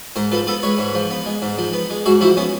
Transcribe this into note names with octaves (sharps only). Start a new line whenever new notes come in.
G#2 A#4 C5
F3 A4 B4
B3 A4 B4
G#3 B4 C#5
G#2
F3
B3
G#3
G#2
F3
B3
G#3
G#2 F#4 G#4
F3 E4 F#4
B3 C#4